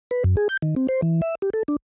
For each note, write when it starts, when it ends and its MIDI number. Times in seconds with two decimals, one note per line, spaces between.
0.11 0.23 71
0.24 0.36 42
0.37 0.48 68
0.49 0.57 91
0.62 0.75 51
0.76 0.87 60
0.89 1.01 72
1.02 1.21 52
1.22 1.35 76
1.42 1.50 67
1.53 1.63 69
1.68 1.76 62